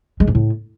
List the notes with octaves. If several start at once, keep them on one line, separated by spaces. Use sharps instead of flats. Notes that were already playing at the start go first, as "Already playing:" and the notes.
G#3
G#2
A2